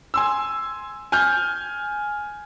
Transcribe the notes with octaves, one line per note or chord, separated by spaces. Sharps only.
G#5 C6 E6
G#5 F6 G6